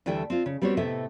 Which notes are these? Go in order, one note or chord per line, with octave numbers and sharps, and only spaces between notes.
D2 E3 G3 A3 E4 G5
C4 F4
C#3
G3 B3 C4 F#4 C#5
A2 C3 A3 B3 D#5 E5